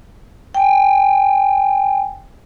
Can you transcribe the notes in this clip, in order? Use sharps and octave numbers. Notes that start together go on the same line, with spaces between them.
G5 G#5